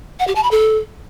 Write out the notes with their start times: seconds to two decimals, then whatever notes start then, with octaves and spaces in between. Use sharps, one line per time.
0.20 F#5
0.27 G4
0.35 A5
0.43 B5
0.51 A4